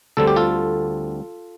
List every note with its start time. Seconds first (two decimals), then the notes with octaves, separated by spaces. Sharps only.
0.17 D2 D3 G3 C4 A4
0.27 G4
0.36 F4 A4